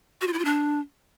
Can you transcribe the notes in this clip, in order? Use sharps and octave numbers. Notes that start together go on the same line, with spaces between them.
F#4
F4
E4
F4
D4